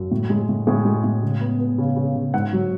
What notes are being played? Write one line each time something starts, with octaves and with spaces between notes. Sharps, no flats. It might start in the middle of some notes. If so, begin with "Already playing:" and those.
Already playing: F#2
A2
G#3
A2
A2 G#4
G#3
A2
C#3
B3
B3
C#3
C#3
C#3
G#2 F#5
F#3